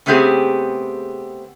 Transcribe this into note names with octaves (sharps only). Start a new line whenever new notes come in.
C#3 A3 B3 C4 G4 G#4